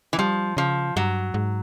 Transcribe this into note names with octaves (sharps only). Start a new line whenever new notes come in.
E3
F3 G3
C#3 F3
G2 F#3
G#2